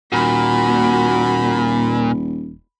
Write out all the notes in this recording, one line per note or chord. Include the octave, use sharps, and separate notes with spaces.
D#1 A#2 F#4 B5